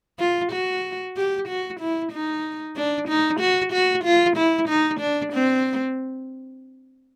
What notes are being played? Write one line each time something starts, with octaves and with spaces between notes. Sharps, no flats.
F4
F#4
G4
F#4
E4
D#4
D4
D#4
F#4
F#4
F4
E4
D#4
D4
C4